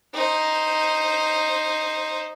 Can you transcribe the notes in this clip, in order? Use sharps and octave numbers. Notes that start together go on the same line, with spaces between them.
D#4 C5